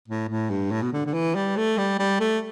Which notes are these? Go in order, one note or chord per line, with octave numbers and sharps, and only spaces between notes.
A2
A2
G2
A2
B2
D3
D3
E3
G3
A3
G3
G3
A3